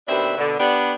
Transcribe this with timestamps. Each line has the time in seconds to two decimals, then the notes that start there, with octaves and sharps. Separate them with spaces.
0.08 D#2 B2 C4 D4 B4 E5
0.37 B2 D3
0.58 B3 D4 G4